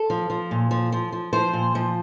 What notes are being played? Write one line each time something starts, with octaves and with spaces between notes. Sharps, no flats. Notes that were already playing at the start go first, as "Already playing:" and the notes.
Already playing: A4
F3
F3
A#2
F3
F3
F3
F3 C5
A#2
F3